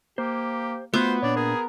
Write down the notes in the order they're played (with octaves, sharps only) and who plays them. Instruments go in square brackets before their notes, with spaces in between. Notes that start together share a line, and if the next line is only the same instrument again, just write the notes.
[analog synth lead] A#3 [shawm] G4 [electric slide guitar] C5
[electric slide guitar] A3 F4 F#4 [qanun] B3 [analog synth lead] B4 [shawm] C5
[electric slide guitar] A#2 D4 [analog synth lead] C#5 [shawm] D5
[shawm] G#4 [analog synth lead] A#4